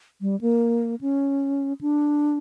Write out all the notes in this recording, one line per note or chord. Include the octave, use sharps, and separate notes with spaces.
G3
A#3
C#4
D4